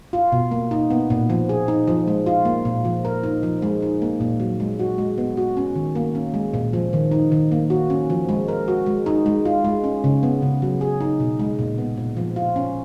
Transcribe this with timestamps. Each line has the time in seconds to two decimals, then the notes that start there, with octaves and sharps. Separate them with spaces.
0.13 F4
0.32 B2
0.51 A#3
0.71 D#4
0.90 B3
1.10 A#2
1.30 F3
1.49 G#4
1.68 D#4
1.87 F3
2.07 G#3
2.26 F4
2.45 A#3
2.65 A#2
2.85 F3
3.05 A#4
3.24 D#4
3.43 F3
3.62 G#3
3.82 D#4
4.02 A#3
4.20 A#2
4.40 F#3
4.60 G#3
4.79 F#4
4.98 G#3
5.18 B3
5.37 F#4
5.57 C#4
5.75 D#3
5.95 A#3
6.15 C#4
6.34 G#3
6.54 A#2
6.73 F3
6.93 D#3
7.11 D#4
7.32 D#3
7.51 A#3
7.70 F#4
7.90 C#4
8.10 F3
8.29 G#3
8.48 A#4
8.68 F#4
8.86 G#3
9.06 D#4
9.26 G#3
9.45 F4
9.65 G#3
9.84 C#4
10.04 C#3
10.23 B3
10.42 C#3
10.62 F#3
10.81 G#4
11.01 D#4
11.20 B2
11.39 G#3
11.59 A#2
11.78 B3
11.97 A#2
12.17 F3
12.36 F4
12.56 C#4